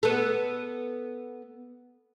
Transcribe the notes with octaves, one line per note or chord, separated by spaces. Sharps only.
B3 A4